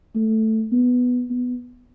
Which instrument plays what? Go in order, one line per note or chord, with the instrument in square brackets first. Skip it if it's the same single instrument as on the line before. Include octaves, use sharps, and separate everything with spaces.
[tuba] A3
B3
B3